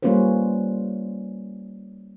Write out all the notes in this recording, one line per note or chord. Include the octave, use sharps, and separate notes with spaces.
G3 A#3 C#4 F4 B4 C5